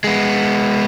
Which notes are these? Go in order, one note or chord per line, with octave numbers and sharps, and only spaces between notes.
G#3 B3